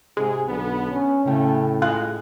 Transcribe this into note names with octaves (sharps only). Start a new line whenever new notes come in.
G#2 C3 G#3 G#4
B1 D3 B3
C#4
A2 C#3 A3 C#4 G5
G#3 F4 F#6